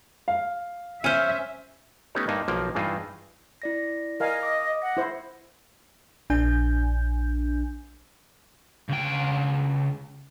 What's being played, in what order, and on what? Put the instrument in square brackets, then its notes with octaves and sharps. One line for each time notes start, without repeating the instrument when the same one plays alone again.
[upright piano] F5
[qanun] C#4 C5 [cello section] E5 [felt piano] F6 D#7
[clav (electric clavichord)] A3 B3 C#4 D#4 G4 C#5
G2 A#3 D#4 D#5 A5
B1 F3 A#3 G5
G2 E3 D#4 F4 G#4 A5
[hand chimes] E4 D5 A#6
[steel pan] A#4 F5 G#5 [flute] D#5
[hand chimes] D6 D#6
[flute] F#5 [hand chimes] A#6
[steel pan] E4 C5
[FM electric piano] A#1 D4 G#5 G6
[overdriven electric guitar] C#2 G5